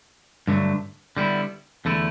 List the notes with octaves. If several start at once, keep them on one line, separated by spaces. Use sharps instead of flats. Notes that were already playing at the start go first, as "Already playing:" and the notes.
G2 D3 F#3 A3
D3 G3 B3 E4
E2 D3 A3 E4